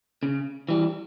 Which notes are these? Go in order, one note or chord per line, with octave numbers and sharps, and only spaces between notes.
C#3
E3 G3